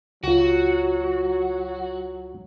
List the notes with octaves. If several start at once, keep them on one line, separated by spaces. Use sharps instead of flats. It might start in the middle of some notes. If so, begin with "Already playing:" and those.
C#2 F#3 F4 F#4